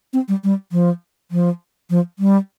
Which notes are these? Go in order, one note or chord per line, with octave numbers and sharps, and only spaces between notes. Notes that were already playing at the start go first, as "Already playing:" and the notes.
C4
G3
G3
F3
F3
F3
G3